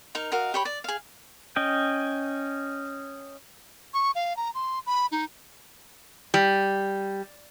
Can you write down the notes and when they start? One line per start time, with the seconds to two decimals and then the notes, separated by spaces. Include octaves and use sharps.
0.15 D#4 A#4
0.32 F#4 A#4 D#5 F5
0.54 G4 C#5 B5
0.65 D5
0.84 G#4 F5
1.56 C#4 D#5 G5
3.94 C#6
4.15 F5
4.37 A#5
4.54 C6
4.86 B5
5.12 D#4
6.34 G3